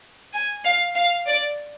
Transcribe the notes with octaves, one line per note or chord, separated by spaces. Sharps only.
G#5
F5
F5
D5